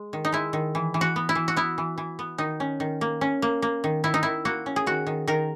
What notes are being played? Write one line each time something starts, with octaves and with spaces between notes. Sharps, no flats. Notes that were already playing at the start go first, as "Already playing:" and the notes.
Already playing: G#3
D#3
D#4
G#3 E4
D#3
E3
E3
F#4
B3
E4
E3
F#4
B3 E4
E3
E3
B3
D#3 D#4
C#4
D#3
A#3
C#4
A#3
A#3
D#3
D#3 E4
D#4
D#3 E4
A#3 F#4
C#4
G#4
D#3 F#4
D#3
D#3 A#4